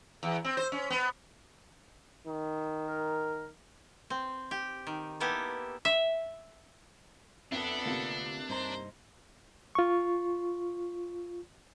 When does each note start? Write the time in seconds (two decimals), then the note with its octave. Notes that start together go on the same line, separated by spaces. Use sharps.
0.23 E2
0.44 C4
0.57 C5
0.72 C#4
0.90 B3
2.27 D#3
2.88 A#4
4.10 C4
4.51 G4
4.87 D#3
5.20 A#3 B3 E4 G4 A4
5.85 E5
7.52 F2 B3 D4 A4 E5
7.86 D2 C3 A#3 F4
8.49 G2 D#4 C5 A#5
9.75 F4 C#6